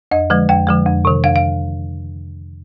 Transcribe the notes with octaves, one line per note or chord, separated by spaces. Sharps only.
F2 D#5
D3 F3 G#3
F2 G5
D3 F3 G#3
F2
C3 D#3
F2 F5
F5